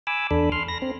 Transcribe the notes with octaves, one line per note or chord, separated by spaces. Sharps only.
G#5 B5 D6 E6
E2 D4 A4 B5
C6 F6
B5 A#6
C4